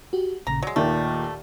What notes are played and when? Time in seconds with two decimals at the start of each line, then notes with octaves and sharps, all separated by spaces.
0.13 F#4 G4
0.47 A1 A#2 C#3 A#5
0.63 F#3 G#3 D5
0.76 D#2 A#2 D#3 A3